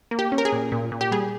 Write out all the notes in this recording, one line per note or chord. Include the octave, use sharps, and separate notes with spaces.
A#3
G4
C#4
A#4
G#4
A#2
A#2
A#2
G4
G3 G#4